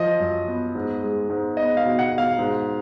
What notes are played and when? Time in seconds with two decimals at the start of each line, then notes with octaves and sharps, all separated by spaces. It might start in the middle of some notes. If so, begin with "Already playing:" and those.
Already playing: F3 D#5
0.20 F#2
0.48 B3
0.75 G#2
1.03 G#3
1.30 G#2
1.57 B3 D#5
1.77 F5
1.85 B2
1.99 F#5
2.12 B2
2.18 F5
2.39 G#2